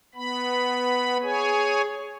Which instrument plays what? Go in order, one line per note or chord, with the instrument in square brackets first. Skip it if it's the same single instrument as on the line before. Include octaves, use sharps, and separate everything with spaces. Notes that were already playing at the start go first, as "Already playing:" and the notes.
[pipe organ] B3 B5
G#4 C#5 G#5